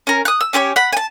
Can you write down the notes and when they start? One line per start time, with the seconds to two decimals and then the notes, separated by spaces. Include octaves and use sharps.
0.07 C#4 A#4
0.25 D#6 F#6
0.41 E6
0.53 C#4 G4 C5 C#5
0.76 F#5 B5
0.93 G#5 A5